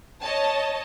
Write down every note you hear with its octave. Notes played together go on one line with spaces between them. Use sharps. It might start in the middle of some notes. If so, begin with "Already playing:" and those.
C#5 D#5 A5